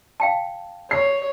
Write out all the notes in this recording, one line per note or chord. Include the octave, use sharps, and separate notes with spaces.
F5 G5 A5
C#5 C7